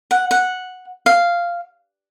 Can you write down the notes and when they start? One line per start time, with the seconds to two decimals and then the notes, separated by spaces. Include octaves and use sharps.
0.11 F#5
0.31 F#5
1.06 F5